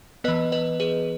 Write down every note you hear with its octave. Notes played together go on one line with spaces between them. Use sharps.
E3 B3 B4 D#5
B4 D#5
G#4 B4